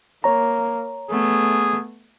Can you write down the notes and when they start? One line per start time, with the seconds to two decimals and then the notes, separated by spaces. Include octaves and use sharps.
0.24 A#3 C#5 A#5
1.11 A3 B3 G#4